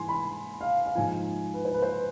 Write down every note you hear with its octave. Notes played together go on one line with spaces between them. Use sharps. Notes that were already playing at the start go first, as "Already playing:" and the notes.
Already playing: G#2 E3 G#5 C6
B5
F5
F5
G#2 F3 G#5
B4
C5
B4
C5